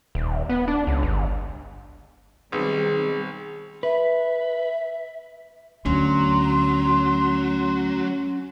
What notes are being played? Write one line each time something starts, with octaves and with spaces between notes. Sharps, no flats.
D#1
B3
D4
C#2
G1
B1 D#3 G3 C4 G#4
B4 E5
D2 F#3 C#4 C6